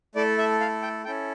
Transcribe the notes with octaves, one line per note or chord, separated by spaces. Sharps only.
A3 E4 A4 D5
E5
F5
G5
C#4 E4 A4 G5